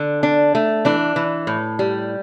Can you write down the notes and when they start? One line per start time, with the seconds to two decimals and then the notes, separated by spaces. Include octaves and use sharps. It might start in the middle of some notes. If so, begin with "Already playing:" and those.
Already playing: D3
0.23 D4
0.55 A3
0.85 E3 D4
1.16 E3
1.47 A2
1.79 G3